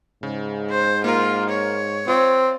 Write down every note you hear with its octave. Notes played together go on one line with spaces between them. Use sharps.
G#2 C#3
C5
A#3 F4 A#4
C#5
C4 F4